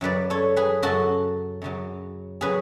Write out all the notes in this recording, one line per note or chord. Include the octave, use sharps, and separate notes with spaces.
F#2 C#3 F#3 B4 D5
A4 C#5
G#4 B4
F#2 C#3 F#3 F#4 A4
F#2 C#3 F#3
C#3 F#3 G#4 B4